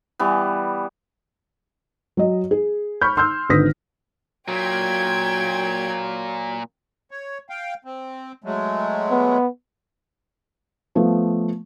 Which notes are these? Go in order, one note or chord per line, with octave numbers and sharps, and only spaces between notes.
E3 G3 B3
F#3 D#5
G#4
B5 C#6 F6 G6
C6 E6 F6 G6
G#1 D3 B4 D#6 A#6 B6
A#2 F#3 A#3 G5 G#6
C#5
F5 G5
C4
F#3 G#3 A3
B3
F3 A3 B3